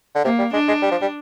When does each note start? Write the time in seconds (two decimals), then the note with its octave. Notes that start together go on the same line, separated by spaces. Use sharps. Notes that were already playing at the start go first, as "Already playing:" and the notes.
0.15 D3
0.24 C3 A#3
0.39 G3
0.53 G#3 D4
0.68 G#3
0.82 G3
0.91 F3
1.01 G3